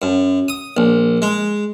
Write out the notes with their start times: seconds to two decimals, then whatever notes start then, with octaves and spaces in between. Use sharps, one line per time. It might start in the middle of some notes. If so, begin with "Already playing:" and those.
0.02 F#2
0.48 D#6
0.77 A#1
1.22 G#3